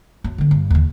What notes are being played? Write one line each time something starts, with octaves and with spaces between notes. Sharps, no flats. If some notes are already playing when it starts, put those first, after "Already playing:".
F#2
D3 E3
G2
D#2 D#3